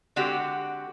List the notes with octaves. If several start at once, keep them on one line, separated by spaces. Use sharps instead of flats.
D3 G#3 C4 F#4 G4 D5